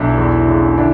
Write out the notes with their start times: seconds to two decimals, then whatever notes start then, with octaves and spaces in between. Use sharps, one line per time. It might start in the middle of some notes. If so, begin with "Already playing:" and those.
Already playing: B1 D4 E4
0.17 E2
0.48 C#3
0.77 D3 D4 E4